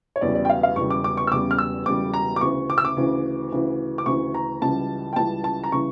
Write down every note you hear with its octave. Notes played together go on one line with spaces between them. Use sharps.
C#5
E1 E2 C#3 G3 D5
D5
G5
F5
F5
E1 E2 C#3 G3 C#6
D6
D6
C#6
E6
E1 E2 C#3 G3 D6
F6
E6
E1 E2 C#3 G3 D6
A#5
D6
D2 C#3 E3 C#6
D6
E6
D6
D2 C#3 E3
D2 C#3 E3
D6
D2 C#3 E3 C#6
A#5
C#2 C#3 E3 G3 A5
G5
C#2 C#3 E3 G3 A5
A5
A#5
C#3 E3 G3 C#6